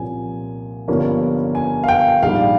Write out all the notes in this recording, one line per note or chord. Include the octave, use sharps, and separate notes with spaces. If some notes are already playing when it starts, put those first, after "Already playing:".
Already playing: C2 A#2 F3 A#3 C#4 G#5
G1 G2 F3 A#3 C#4
G#5
F5
G5
A#1 G#2 G3 F5